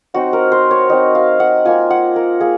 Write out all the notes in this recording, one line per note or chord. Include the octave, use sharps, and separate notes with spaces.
F#3 C4 D#4 F#4
A#4
C5
C#5
F#3 C4 D#4 D#5
F5
F#5
A#3 F4 G#5
F#5
A#4
A#3 G#4